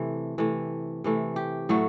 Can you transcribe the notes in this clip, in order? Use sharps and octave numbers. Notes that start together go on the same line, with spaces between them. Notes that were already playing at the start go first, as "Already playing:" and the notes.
Already playing: C3 E3 A3
C3 E3 A3
C3 E3 A3
G4
A2 F#3 A3 F#4